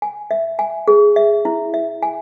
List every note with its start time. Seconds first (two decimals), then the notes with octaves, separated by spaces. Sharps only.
0.02 G#5
0.31 E5
0.59 G#5
0.88 G#4
1.16 E5
1.45 E4
1.74 E5
2.02 G#5